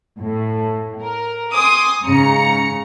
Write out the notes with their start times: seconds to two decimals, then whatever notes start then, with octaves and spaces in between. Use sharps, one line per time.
0.18 A2
1.02 A#4
1.52 G#5 C6 D6 D#6
2.04 G#2 C#3 A#5 C#7